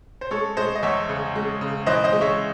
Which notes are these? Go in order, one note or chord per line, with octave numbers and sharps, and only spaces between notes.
C5
G#3 A4 C#5
G#3 C5 D#5
D#5
E2 C#5 E5
C#3
G#3
C#3
E3 C5 D#5
C5 D#5
G#3
C#5 E5